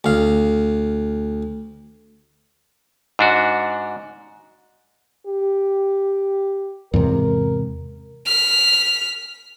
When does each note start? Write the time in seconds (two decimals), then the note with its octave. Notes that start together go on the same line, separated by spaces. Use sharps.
0.04 D2 F5
3.19 G#2 D4 F#4
5.27 G4
6.94 E2 G#2 C3 A#4
8.26 F6 B6